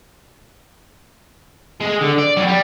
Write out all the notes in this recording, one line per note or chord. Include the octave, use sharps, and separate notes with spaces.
G#3
D3
D5
F#3 G3
G3